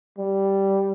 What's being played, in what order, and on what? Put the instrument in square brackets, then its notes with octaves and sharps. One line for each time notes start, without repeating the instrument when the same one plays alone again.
[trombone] G3